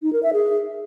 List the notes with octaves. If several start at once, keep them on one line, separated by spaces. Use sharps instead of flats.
D#4
A#4
E5
G#4